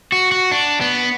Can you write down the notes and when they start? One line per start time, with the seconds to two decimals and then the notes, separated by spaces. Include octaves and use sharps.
0.12 F#4
0.32 F#4
0.51 D4
0.81 B3